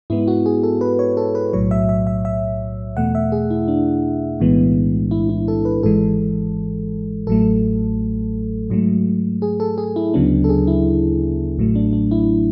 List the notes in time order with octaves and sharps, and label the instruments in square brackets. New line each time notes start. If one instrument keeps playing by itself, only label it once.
[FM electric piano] G#2 G#3 B3 E4
F#4
G#4
A4
B4
C#5
A4
B4
B1 A2 F#3 C#5
E5
E5
E5
E5
E2 B2 A3 F#5
E5
G#4
E4
D4
B1 A2 E3 G#3 B3
E4
E4
A4
B4
G#1 G#2 E3 G#3 A4
A1 A2 F#3 A3 A4
G#2 F#3 A3
G#4
A4
G#4
E4
D2 C#3 F#3 B3 D4
A4
G#4
E4
A1 A2 F#3 A3
D4
D4
E4